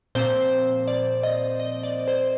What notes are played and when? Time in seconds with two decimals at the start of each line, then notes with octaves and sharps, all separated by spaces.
0.15 A#2 F3 C4 C5
0.88 D5
1.23 D#5
1.60 D#5
1.83 D5
2.08 C5